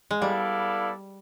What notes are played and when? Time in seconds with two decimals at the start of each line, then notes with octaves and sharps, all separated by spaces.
0.11 G#3
0.21 G3 B3 E4 A4 D5 F5